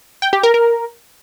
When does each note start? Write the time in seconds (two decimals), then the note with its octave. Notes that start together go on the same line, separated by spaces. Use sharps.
0.22 G5
0.33 G4
0.43 A#4
0.54 A#4